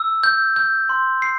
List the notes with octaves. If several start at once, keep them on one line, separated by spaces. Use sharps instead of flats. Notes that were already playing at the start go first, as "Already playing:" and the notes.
Already playing: E6
G6
G6
C6
C7